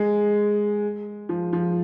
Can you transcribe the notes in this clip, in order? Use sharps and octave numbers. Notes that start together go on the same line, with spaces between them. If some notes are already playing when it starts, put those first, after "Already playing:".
Already playing: G#3
F3
F3